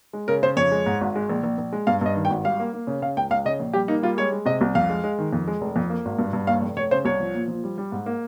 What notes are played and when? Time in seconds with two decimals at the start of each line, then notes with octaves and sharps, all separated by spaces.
0.13 G#3
0.28 C#3 A#4
0.43 C#3 C5
0.57 F2 C#5
0.72 G#3
0.86 G#2
1.01 G#1
1.15 G#3
1.29 A#1
1.44 A#1
1.58 A#1
1.73 G#3
1.87 G2 F5
2.01 G2 D#5
2.15 D#3
2.25 G5
2.30 G#1
2.45 G3 F5
2.59 A#3
2.73 A#3
2.87 C#3
3.02 C#3 F5
3.17 C#2 G5
3.30 C#2 F5
3.45 C#3 D#5
3.60 A#1
3.73 G3 G4
3.88 A#3 D#4
4.03 G3 F4
4.17 G#3 C#5
4.32 G#3
4.46 C3 D#5
4.61 C2
4.75 F2 F5
4.90 G#3
5.04 G#3
5.18 D#3
5.33 F2
5.48 G#3
5.61 F1
5.76 F2
5.90 A#3
6.05 G#1
6.19 G2
6.33 G2
6.47 D#2 F5
6.62 F1
6.77 F1 C#5
6.91 C#3 C5
7.05 C2 C#5
7.20 F3
7.34 A#2
7.48 F3
7.64 G3
7.78 G3
7.92 G#2
8.06 A#3